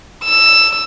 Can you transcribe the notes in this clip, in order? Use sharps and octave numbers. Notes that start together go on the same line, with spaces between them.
E6